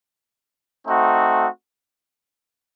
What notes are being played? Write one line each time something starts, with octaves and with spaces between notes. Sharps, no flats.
A3 C4 D#4 F#4